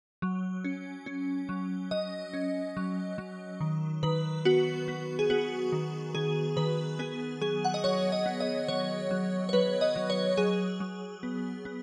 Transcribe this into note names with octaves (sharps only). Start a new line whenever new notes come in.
F#3
C#4
C#4
F#3
F#3 D#5
C#4
F#3
F#3
D#3
D#3 B4
B3 F#4
B3
G#4
B3 F#4
D#3
D#3 G#4
D#3 B4
B3 G#4
F#3 G#4
F#5
D#5
F#3 C#5
D#5
B3
D#5
F#3 C#5
F#3
C#5
F#3 B4
D#5
F#3
C#5
F#3 G#4
F#3
B3
B3